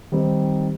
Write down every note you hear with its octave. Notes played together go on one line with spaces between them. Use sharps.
D#3 G3 C4 D#4